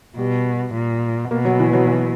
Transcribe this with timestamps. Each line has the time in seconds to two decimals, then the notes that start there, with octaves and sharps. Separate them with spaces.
0.17 B2 G3
0.74 A#2
1.31 B2 A#3
1.45 F#3
1.59 E3
1.73 F#3
1.87 E3